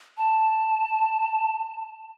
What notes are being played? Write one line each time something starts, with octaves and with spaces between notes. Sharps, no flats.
A5